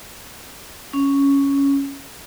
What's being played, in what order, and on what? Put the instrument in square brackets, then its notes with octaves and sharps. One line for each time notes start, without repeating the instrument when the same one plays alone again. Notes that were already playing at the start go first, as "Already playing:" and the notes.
[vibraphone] C#4